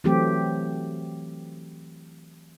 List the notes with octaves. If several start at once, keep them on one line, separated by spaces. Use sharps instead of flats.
E3 F#3 A3 C4 G4